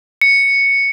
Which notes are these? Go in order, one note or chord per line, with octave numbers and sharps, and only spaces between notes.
C#7